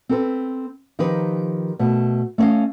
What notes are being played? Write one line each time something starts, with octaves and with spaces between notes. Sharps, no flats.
C4 A4 B4
D#3 F3 D#4 G4 B4
B2 A3
A3 C#4 D5 D#5 F5